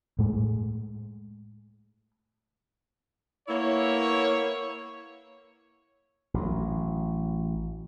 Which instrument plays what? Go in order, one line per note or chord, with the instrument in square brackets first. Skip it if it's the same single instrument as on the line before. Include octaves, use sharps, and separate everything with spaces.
[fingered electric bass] A2 G#3
[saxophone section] A#3 B3 E4 [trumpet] C#5
[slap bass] A1 F#3